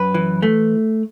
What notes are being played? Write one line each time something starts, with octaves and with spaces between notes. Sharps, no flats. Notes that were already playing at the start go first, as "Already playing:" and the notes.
Already playing: F#2 B4
E3
A3